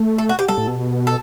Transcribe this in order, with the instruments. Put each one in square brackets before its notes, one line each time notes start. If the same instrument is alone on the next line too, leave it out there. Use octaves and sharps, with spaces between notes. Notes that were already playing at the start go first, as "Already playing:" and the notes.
Already playing: [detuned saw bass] A3
[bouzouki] A4
F#4
G4
[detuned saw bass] G3 [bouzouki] A4
[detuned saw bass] A2
B2
[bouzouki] A4